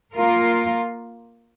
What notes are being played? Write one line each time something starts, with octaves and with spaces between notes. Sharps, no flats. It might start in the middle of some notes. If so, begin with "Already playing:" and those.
A#3 F4 A#4